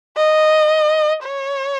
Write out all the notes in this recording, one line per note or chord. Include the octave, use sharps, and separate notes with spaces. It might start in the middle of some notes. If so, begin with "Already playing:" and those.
D#5
C#5